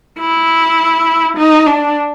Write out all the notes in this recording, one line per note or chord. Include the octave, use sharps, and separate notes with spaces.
E4
D#4
D4